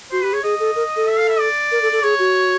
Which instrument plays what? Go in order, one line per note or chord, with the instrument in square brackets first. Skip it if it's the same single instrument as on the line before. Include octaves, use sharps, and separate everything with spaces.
[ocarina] F#4 [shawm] C5
[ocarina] G4 [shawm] B4
[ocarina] G#4 [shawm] C#5
[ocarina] G#4 [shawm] D#5
[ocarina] A4
A#4
A4
[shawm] E5
F5
E5
D5
[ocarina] A#4
A4
A4
[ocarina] G#4 [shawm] C#5
[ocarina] F#4